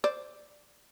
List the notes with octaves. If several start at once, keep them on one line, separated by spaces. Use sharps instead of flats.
C5 D5